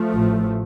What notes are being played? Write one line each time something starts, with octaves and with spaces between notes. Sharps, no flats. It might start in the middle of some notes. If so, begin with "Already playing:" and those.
Already playing: F3 A3
A1 A2